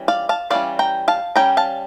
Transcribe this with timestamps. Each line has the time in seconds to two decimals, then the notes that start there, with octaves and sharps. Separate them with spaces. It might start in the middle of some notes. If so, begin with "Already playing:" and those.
Already playing: E3 G3 C#4
0.08 D5 F5
0.29 F5 A5
0.50 E3 G3 C#4 D5 F5
0.79 G5 A#5
1.08 F5 A5
1.36 G3 C#4 G5 A#5
1.57 F5 A5